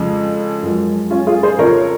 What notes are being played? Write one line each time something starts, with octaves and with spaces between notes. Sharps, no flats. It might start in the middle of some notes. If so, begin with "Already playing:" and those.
Already playing: F2 C#3 F3 G#3
F#2 F3 G#3
C#4 F4
F4 G#4
G#4 C5
F2 C#3 F3 A#4 C#5